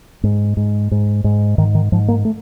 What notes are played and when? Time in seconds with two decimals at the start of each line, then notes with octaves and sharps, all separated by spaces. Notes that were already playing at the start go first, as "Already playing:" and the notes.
0.23 G#2
0.57 G#2
0.91 G#2
1.24 G#2
1.58 G#2 D#3
1.75 D#3
1.92 G#2 F3
2.08 A#3
2.25 A3